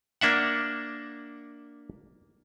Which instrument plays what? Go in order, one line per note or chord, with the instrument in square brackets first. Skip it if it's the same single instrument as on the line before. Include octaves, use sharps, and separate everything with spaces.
[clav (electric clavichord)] A#3 D4 E5 F#5